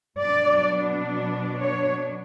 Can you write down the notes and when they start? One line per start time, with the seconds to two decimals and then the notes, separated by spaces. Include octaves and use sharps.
0.18 B2 F#3 B3 D4 D5
1.59 C#5